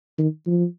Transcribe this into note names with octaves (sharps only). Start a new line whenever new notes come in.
D#3
F3